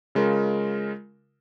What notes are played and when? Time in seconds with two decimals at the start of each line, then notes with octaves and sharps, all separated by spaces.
0.15 C#3 G#3 F4 A#4